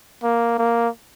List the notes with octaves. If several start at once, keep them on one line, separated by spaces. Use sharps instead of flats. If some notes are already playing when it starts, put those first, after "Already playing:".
A#3
A#3